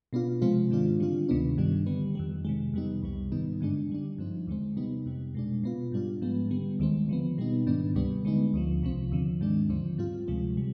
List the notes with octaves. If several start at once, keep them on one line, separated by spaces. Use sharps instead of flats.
B2 B3 D4 F4
C3 F3 G#3 C4 F4
G#2 D#3 G#3 D4 F4
D3 G3 D4 F4
D2 C3 D#3 B3 D4
G2 D#3 G3 D4
D3 G3 B3
F2 D#3 G3
C3 D#3 G#3
F2 C3 G3 B3 D#4
C2 C3 G3
G#2 D#3 B3 D#4
G2 D3 G#3 D4
D3 G3 D4
G2 F3 C4 D#4
D#2 D3 G#3 C4
C3 G3 B3 D#4
F2 C3 G3
B2 G#3 D4
B2 B3 F4
G#2 G3 D4 F4
G#2 F3 G#3 B3
D3 G3 B3
D#2 D#3 G#3 C4
D3 F3 B3
B2 G3 B3 D#4
G#2 D#3 B3 D4
D2 C3 G3 B3 D4
D3 G#3 B3 D#4
D2 D3 F3
C2 C3 F3 C4
D#2 D3 F3
G#2 D#3 G#3 D4
D#2 D3 F3 C4
G#2 G3 C4 F4
D2 C3 F3 G#3
C3 G3